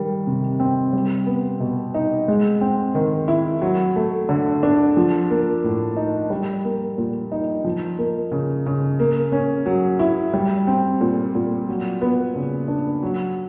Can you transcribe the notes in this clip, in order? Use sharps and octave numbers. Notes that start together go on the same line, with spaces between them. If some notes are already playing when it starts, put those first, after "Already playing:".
Already playing: D#3 G3
C3
C4
G3
B3
B2
D#4
G#3
C4
D#3
E4
F#3
A3
D3
D4
F3
A#3
A2
D#4
G3
A#3
A#2
D#4
F3
A#3
C#3
C#3
A#3
C#4
F#3
E4
G3
C4
A#2
A#2
F#3
B3
C#3
D4
F#3